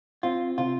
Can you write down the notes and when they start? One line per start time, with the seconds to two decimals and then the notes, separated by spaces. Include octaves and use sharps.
0.23 C4 F4
0.58 C3 F4